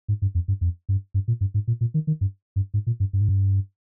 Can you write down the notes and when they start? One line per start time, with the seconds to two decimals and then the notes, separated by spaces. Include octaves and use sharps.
0.08 G#2
0.22 G2
0.35 F2
0.48 G2
0.61 F2
0.89 G2
1.14 G2
1.28 A#2
1.41 G2
1.54 G#2
1.68 A#2
1.81 A#2
1.94 D#3
2.07 D#3
2.21 G2
2.56 G2
2.74 G#2
2.87 A#2
3.00 G2
3.13 G2
3.21 G#2
3.29 G2